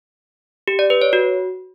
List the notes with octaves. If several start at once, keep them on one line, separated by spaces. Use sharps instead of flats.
G4
D5
B4
C#5
F#4